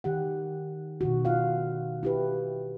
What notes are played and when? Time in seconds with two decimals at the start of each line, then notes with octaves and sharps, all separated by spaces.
0.04 D#3 G4 F#5
1.01 B2 D#3 F#4
1.25 F4 F5 F#5
2.03 E4 G4 B4